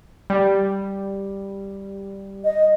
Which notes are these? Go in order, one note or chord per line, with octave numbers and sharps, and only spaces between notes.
G3
D#5